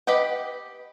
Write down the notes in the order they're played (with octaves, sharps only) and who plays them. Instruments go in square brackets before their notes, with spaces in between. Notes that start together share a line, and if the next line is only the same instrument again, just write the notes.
[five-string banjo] G4 B4 D#5 F#5 G5